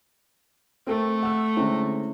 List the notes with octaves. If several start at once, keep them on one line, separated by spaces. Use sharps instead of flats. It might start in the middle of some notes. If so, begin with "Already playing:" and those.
A3 C4 A4 A#4
F#5 E6
D3 G#3 C4 C#4 E4